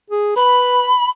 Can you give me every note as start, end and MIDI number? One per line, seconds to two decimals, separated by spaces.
0.11 0.34 68
0.36 0.91 71
0.36 1.09 83